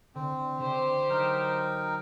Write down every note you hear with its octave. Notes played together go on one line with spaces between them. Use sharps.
D3 C4
D3 G4 C5
F#3 D#4 A#4 G5